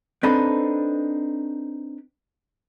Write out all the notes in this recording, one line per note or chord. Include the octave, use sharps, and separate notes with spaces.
C4 D4 D#4 A4 B4